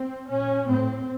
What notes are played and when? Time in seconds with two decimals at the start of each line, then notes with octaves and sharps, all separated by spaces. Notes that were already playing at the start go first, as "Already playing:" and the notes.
Already playing: C4
0.29 A#2 C#4
0.68 A2 C4